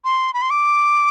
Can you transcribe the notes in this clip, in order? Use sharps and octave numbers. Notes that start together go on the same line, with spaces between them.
C6
B5
C6
D6